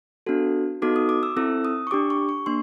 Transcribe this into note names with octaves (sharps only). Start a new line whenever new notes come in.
B3 D4 F#4 A4
B3 D#4 F#4 A4 D6
D#6
D6
E6
C4 E4 A4 E6
D#6
C#6
D4 G4 D6
C#6
C#6
A#3 D4 C6